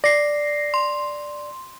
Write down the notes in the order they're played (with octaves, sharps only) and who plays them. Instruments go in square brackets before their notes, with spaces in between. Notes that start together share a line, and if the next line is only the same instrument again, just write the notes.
[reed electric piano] D5 [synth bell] A#6 C7
[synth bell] C6